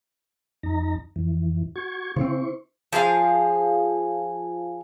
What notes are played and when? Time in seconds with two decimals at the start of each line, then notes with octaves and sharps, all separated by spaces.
0.63 F2 D#4 A#5
1.16 F2 E3
1.76 F#4 C#6 G#6
2.16 C#3 C4 E4 C5 C#6
2.93 F3 G#4 A4 F5